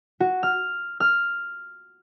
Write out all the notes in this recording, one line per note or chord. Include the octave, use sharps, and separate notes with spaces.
F#4
F6
F6